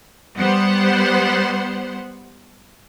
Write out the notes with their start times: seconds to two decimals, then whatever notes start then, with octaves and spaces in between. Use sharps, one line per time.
0.37 G3 B3 C5 F#5